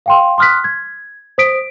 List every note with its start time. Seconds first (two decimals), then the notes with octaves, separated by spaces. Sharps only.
0.06 F5 G5 C6
0.38 C6 D#6 F6 F#6 B6
0.64 G#6
1.38 C5 D#6 B6 D7